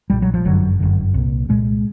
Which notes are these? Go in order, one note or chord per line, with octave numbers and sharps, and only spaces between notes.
B1 A#2 G3
F#3
F3
G1 F#2 D3 F#3
G1 F#2 D3
C2 A#2
C2 A#2 G#3